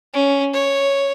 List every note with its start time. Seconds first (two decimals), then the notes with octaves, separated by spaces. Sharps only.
0.14 C#4
0.54 C#5